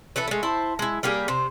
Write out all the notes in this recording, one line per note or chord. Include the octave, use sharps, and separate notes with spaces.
E3 A4 B4 E5
G#3 A3
E4 C5 A5
G#3 E4
G3 A#3 G4 G#4
C3 C5